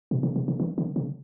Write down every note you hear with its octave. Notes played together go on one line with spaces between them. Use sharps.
B2
C#3
C3
C#3
D#3
D3
C#3